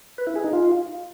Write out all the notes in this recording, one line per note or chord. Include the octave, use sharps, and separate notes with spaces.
B4
E4
G#4
D#4
F4